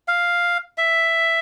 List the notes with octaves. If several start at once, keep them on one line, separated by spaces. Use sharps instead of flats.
F5
E5